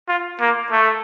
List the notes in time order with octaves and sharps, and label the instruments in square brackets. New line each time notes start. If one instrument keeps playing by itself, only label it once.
[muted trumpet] F4
A#3
A3